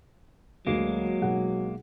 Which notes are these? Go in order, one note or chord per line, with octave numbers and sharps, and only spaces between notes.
D2 D3 F#3 G#3 A#3
B1 G#4 F#5